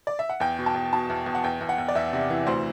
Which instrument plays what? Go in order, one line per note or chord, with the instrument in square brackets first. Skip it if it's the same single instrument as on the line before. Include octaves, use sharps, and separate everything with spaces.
[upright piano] D5
E5
F#5
E2 G5
B2
A5
E2
B2 A5
E2
E2
F#5
E2 G5
E2
F#5
E2
D5
E2 E5
C3
E3
D2 C5